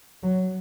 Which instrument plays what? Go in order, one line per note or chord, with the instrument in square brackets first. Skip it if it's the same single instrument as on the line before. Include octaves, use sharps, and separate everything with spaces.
[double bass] F#3